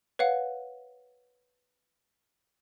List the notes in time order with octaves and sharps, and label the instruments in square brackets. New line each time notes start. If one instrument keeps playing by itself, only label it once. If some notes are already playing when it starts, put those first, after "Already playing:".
[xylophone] B4 C#5 F5 F#5